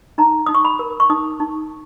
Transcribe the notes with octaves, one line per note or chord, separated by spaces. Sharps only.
D#4 A#5
D#4 D#6
C#6
B5
A#4
C#6
D#4 D#6
D#4